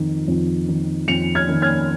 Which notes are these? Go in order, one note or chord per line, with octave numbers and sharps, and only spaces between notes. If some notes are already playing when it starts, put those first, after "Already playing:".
Already playing: F2 D#3
F2
D#3
F2 C#7 F7
F6 G#6
D#3
F6 G#6